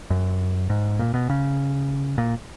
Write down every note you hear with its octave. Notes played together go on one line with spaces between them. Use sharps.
F#2
G#2
A#2
B2
C#3
A#2